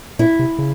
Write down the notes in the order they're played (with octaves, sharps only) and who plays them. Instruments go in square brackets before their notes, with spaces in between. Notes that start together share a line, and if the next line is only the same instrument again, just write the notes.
[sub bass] A#2 [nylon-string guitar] E4
[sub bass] C3
C#3